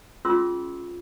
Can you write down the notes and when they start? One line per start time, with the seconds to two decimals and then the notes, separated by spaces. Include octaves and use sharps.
0.25 C#4 F4 G#4 C6 E6